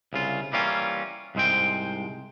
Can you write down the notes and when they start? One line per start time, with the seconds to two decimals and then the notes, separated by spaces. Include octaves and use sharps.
0.13 C2 C#3 F4
0.53 E3 G3 A#3 C#4 F4
1.35 C2 G#2 G#3 C5 G5